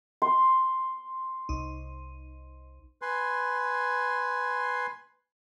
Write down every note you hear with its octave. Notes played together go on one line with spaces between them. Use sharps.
C6
C2 D#4
B4 G#5 C6